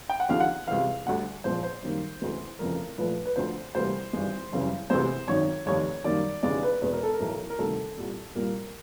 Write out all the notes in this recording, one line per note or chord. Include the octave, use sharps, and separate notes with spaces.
G5
F#5
D#2 D3 F3 G#3 F5
F#5
C#2 C3 E3 F5
D2 D3 G3 F#5
A#1 A#2 F3 G#3 C5
C5
F#2 D#3 G3 A#3
D2 C#3 E3 G#3
F1 F2 C#3 E3 A#4
A#1 A#2 F3 A3 B4
B4
D2 D3 F3 C5
D2 C3 E3 G3 A#3 C5
G#1 G2 E3 G#3
F#1 F#2 C#3 E3 G3
D2 C3 E3 G#3 C5
G#1 F#2 D#3 C#5
F1 D#2 D#3 C#5
F#2 D#3 G3 A#3 D5
E1 D#2 C#3 E3 G#3 D5
B4
E1 E2 B2 G#3 B4
A#4
A4
A#4
B1 A2 E3 A3
A#4
D2 C3 D#3 G3 A#3 A4
C2 A#2 G3
C2 A#2 G3 A#3 A#4